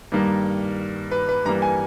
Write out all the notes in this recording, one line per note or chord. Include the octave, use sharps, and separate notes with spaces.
G2 D#3 G3 A#3
B4
B4
G2 E3 G3 A#3 A#5
G#5